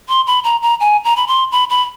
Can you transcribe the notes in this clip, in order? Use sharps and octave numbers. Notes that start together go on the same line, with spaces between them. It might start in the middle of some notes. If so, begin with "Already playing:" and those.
C6
B5
A#5
A#5
G#5
A#5
B5
C6
B5
B5